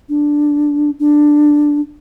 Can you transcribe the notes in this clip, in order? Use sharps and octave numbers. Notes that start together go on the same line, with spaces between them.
D4
D4